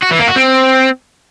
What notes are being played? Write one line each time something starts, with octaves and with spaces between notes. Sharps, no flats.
F#4
E3
A#3
F#4
C4